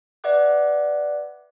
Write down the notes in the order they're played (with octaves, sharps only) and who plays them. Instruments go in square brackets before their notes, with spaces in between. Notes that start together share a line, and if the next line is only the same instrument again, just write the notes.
[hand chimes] B4 D5 E5 F#5 D6 F#6